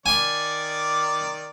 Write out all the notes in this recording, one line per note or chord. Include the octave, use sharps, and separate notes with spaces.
D#3 D5 G#5 D6